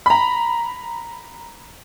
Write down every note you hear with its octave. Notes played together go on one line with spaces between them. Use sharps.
A#5 B5